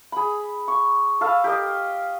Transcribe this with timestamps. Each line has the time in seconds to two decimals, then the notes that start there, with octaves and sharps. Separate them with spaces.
0.12 G#4 B5
0.68 C#6
1.21 A4 B4 F5
1.44 G4 A#4 D#5